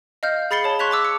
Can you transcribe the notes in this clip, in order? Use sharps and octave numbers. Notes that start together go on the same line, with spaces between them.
D#5 F5 F6 G6
G#4 B5 A6 C7 C#7 G7
C#5 A5
C6 C#6 F#6 G#6 B6 F7
A5 D6 E6
C#7